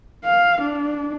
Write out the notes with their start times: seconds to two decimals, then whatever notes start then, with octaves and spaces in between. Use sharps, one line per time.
0.25 F5
0.61 D4